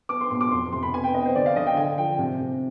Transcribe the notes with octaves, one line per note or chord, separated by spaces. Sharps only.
B3 D6
C6
B2 C6
D6
F2 C6
C3 C6
B5
B3 G#5
G5
B3 D#5
C5
D3 D5
F5
D3 D#5
G5
D3 G#5
F3 G5
C3
C3